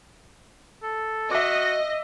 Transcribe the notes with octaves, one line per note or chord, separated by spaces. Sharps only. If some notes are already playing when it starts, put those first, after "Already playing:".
A4
F#4 D#5 E5 D6